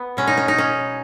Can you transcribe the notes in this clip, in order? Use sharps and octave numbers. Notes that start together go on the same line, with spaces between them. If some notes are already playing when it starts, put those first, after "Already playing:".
Already playing: B3
B2 G#3 C#4
D#4
C#4
D#4
C#4